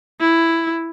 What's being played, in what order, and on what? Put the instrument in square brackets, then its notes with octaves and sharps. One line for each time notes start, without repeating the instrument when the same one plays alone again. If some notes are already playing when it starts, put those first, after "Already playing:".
[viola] E4